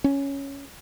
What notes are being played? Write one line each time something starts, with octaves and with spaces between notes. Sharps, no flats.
C#4